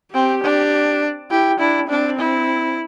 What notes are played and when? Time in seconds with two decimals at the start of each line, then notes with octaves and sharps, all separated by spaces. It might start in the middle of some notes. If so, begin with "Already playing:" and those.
0.14 C4 G4
0.43 D4
1.31 E4 G4
1.59 D4 E4
1.89 C4 D4
2.18 E4